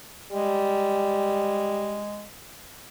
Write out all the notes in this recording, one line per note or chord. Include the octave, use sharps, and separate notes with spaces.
G3 G#3